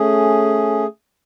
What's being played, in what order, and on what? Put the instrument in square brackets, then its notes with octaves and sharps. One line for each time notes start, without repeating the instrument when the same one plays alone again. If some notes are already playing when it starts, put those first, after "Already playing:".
Already playing: [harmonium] A3 C#4 G#4